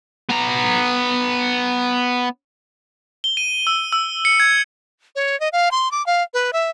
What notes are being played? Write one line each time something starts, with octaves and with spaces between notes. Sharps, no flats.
B3 A#5
G7
D#7
E6
E6
C#7
G#6
C#5
D#5
F5
C6
D6
F5
B4
E5